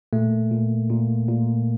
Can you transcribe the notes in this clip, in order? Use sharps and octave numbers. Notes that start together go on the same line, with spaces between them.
A#2 A3
A#2
A#2
A#2